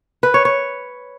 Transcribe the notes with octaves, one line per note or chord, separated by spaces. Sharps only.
B4
C#5
C#5